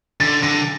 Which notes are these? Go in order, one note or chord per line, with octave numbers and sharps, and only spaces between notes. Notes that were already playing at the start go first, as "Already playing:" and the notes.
D3 A6
D3 A#6